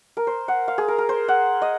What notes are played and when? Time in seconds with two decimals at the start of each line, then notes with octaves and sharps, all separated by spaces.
0.17 A#4
0.27 C5
0.48 F#5
0.68 F5
0.78 G#4
0.88 A#4
0.98 A#4
1.09 C5
1.28 F#5
1.62 D#5